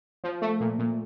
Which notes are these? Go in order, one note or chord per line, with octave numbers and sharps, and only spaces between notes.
F3
A3
A#2
A#2